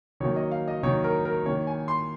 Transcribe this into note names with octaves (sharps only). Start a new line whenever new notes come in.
D#3 F#3 A#3 C#5
D#5
F5
D#5
D#3 F#3 A#3 C#5
A#4
A#4
D#3 A#3 C#5
G#5
C6